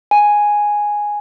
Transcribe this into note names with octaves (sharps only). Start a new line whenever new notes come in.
G#5